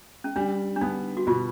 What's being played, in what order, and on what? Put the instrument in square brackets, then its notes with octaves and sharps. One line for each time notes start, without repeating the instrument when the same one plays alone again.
[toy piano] C#4
[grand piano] G3 [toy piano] D4
[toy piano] D4
[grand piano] B3 [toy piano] D#4
[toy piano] F#4
[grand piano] B2 [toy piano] F4